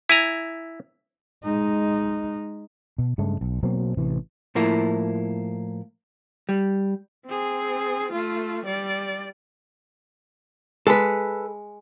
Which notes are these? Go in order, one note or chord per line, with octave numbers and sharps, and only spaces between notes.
E4 G#5 A#5
G#3 D#4
B2
G2 C#3 G#3 A3
B1
B2 F#3 A#3 C4
A1 C3 E3
A2 F3 A#3 E4
G3
C4 G#4
A3 F4
G3 D5
G#3 A4 B4